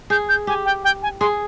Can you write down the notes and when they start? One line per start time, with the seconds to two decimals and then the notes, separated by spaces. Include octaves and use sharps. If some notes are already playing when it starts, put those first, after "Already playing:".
0.10 G#4 G6
0.29 G6
0.47 G4 G#5
0.65 G5
0.84 G5
1.03 G#5
1.21 G#4 C6